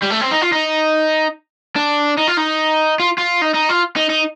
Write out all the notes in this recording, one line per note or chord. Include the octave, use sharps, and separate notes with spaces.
G3
A3
C4
D#4
F4
D#4
D4
D#4
F4
D#4
F4
F4
D#4
D#4
F4
D#4
D#4